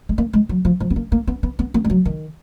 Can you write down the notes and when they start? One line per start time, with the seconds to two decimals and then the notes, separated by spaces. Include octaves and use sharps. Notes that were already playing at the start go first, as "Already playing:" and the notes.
0.09 G#3
0.18 A#3
0.33 G#3
0.49 F#3
0.65 F3
0.80 F3
0.90 B3
0.96 A#3
1.12 A#3
1.27 B3
1.43 B3
1.59 B3
1.74 A#3
1.85 G#3
1.90 F#3
2.05 D#3